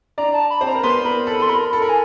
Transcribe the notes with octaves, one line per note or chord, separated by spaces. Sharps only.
D4 D5 A#5
A5
B5
C4 C5
A#5
A#4
B3 B4 C6
A#4 B5
A4 B5
A4 C6
A#4 B5
A4
A#4 B5
G#5